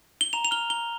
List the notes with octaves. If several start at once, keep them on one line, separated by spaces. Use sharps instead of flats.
G7
A#5 F7
F7
F6 G7
A#5 G7